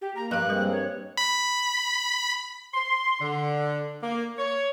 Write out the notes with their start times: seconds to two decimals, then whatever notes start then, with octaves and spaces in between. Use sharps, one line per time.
0.01 G4
0.16 A#3 A#5
0.31 G2 F3 G4 F5 F#6
0.49 G3 G#3 A#3 C4 A#4
0.71 C#5
1.17 B5
2.74 C6
3.21 D3
4.03 A#3
4.38 C#5